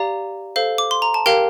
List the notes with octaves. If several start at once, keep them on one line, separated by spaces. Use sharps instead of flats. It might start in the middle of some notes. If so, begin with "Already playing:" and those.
Already playing: G4 D5 F5 A#5
A4 C5 F5
D6
C6
A#5
A5
G4 A#4 F5 G5